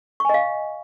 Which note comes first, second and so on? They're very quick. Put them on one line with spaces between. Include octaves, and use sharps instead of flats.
C#6 G#5 D#5 F5